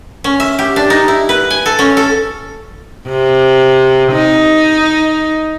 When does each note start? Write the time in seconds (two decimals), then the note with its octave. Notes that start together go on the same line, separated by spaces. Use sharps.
0.24 C#4
0.40 E5
0.59 G4
0.76 D4
0.90 D#4
1.08 E4
1.29 B4
1.50 G#5
1.66 A4
1.79 C#4
1.97 A4
3.07 C3
4.12 D#4